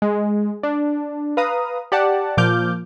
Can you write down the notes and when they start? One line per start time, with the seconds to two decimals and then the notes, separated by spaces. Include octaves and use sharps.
0.02 G#3
0.63 D4
1.37 B4 F5 A#5 D#6
1.92 G4 D5 F#5 A5
2.37 A#2 F3 D6 F6 G6